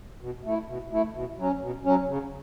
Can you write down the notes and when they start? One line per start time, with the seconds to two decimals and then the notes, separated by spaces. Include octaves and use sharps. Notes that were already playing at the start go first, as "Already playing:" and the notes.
0.21 B2
0.44 A3 E4
0.68 B2
0.92 A3 E4
1.14 B2
1.38 F#3 C#4
1.61 B2
1.85 F#3 C#4
2.08 C#3